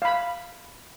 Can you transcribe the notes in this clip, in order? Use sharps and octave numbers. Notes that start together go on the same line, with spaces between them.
F5 B5